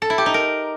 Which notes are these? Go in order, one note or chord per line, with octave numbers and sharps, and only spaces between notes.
A4
E4
G4
D#4
A#4